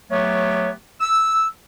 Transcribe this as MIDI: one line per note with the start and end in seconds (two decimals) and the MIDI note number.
0.11 0.71 54
0.11 0.71 57
0.11 0.71 59
0.11 0.71 67
0.11 0.71 73
1.01 1.46 88